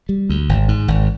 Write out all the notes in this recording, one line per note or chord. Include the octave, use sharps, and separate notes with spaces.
G3
D2
G#1
G#2
G#1